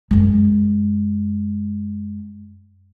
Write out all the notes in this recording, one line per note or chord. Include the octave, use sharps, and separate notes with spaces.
F#2 G#3